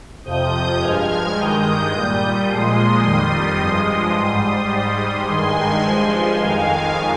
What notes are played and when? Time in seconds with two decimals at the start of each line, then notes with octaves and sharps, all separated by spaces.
0.24 F2 C3 F3 D#6 G6
0.80 G2 F3 G#3 F6 G#6
1.36 G2 D#3 G#3 D#6 G6
1.92 A#2 G3
2.48 A#2 F3 G#3 C6 D#6
3.04 F2 D#3 G3 C6 D#6
3.59 G2 F3 G#3
4.15 G#2 G3
4.71 G#2 G3
5.26 G2 D#3 G#3 G#5 C6
5.82 G2 F3 G#3
6.38 F2 D#3 G#3 F5 G#5